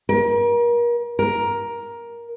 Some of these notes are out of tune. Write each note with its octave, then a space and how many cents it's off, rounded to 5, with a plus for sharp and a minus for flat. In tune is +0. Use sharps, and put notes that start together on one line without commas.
A#4 +35
A#4 +10